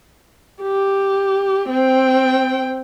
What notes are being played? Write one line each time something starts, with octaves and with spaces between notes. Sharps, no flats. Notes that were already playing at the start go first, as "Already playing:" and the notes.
G4
C4 G5